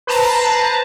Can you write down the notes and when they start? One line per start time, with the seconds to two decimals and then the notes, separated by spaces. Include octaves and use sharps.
0.07 B4 C5 A5 A#5